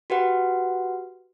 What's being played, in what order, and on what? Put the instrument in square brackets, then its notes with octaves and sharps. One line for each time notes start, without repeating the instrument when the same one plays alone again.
[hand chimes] F#4 G4 B4 F#5